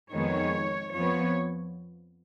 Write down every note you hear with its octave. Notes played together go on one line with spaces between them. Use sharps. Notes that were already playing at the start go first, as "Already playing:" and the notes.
F2 D#3 G#3 B3 C#5
F2 F3 B3 C#5